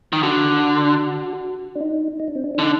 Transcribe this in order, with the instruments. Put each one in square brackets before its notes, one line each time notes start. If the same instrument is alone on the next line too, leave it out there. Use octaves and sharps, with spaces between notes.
[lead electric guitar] D#3
[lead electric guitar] D3 [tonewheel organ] F#4
[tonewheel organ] D4
D#4
D#4
D4
C4
D4
D4
[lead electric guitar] D3 [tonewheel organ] D#4